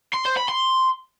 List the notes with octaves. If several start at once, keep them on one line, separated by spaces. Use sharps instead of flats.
C6
C5
B5
C6